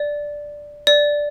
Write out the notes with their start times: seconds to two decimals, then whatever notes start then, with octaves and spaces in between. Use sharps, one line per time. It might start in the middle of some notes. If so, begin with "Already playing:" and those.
Already playing: D5
0.87 D5